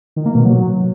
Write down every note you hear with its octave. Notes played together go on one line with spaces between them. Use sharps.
D#3
A#3
B2
F#3